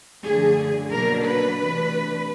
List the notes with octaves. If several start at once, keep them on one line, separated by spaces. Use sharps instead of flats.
F#2 D3 F3 A3 G#4
B2 F#3 A#3 D4 A#4
B4
C3 E3 A3 D4